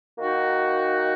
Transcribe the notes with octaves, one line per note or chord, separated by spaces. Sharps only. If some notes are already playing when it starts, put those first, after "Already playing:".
D#3 A#3 D#4 F#4